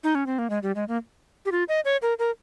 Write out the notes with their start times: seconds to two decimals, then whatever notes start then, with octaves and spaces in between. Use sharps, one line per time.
0.04 D#4
0.15 C#4
0.26 C4
0.39 A#3
0.50 G#3
0.63 G3
0.75 G#3
0.88 A#3
1.46 G4
1.52 F4
1.69 D#5
1.85 C#5
2.02 A#4
2.19 A#4